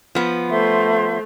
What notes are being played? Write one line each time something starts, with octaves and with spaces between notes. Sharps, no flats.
F3 B3
A3 C5 E5 C6